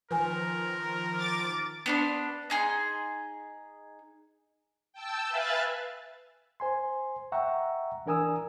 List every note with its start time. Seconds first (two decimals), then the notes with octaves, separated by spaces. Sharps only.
0.11 D#3 F3 A#4 B4 G#5
1.19 D6 A6
1.86 B3 D4 C6
2.50 D#4 G#4 C6
4.93 G5 A5 E6
5.29 B4 E5 F5 G#5 F#6 A6
6.60 C5 G#5 C6
7.32 E5 F#5 G5 A#5 C#6 E6
8.06 E3 D4 A#4 G#5 D#6 E6